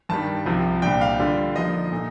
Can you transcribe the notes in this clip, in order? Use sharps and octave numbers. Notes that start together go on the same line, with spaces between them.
G2 D#3 G3 A5
C2 C3 F3
C2 A#2 G3 D4 G5
F5
D3 G3 D4 F4
D3 F3 A#3 D#4 D#5
A#2 A3 D#4